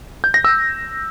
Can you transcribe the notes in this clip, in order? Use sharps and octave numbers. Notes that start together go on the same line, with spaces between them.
G6
A#6
E6